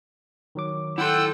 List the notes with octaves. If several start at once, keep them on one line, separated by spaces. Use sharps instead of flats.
D#3 F#3 D6
E4 A4 F#5 G5 C6 E6